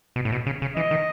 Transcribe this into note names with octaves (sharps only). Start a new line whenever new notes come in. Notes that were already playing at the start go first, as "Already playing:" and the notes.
B2
A2
B2
C#3
C#3
E3 D#5
D#3